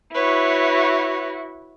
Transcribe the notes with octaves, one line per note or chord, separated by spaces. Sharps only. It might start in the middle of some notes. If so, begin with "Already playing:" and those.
E4 F#4 B4 C#5